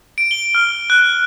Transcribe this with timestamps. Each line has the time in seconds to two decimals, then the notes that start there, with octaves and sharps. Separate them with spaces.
0.18 D7
0.31 G7
0.55 F6
0.90 F#6